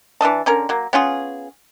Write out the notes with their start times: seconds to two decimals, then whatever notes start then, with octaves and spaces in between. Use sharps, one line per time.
0.21 E3 D4 D#5 A5
0.46 D3 C#4 A#4
0.69 F#3 A#3
0.93 B3 C#4 F4 G#4